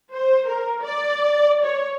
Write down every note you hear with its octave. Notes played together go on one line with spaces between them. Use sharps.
C5
A#4
D5
C#5